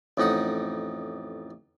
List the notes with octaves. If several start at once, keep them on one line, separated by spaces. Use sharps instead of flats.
A1 F2 D#4 F#5 D#6